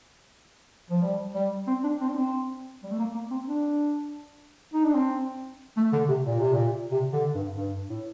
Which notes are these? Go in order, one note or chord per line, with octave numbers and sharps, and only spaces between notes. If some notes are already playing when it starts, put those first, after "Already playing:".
F3
G3
G3
C4
D4
C4
D4
C4
G3
A3
A#3
A#3
C4
D4
D#4
D4
C4
A3
D3
C3
A#2
C3
A#2
C3
D3
G2
G2
A2